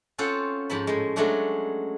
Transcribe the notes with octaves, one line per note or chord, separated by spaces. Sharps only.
C4 C#4 F4 A4 C5 F#5
G#2 F3 A5 B5
A2 G#3
F#3 G#3 A3 C#4 D4 G#4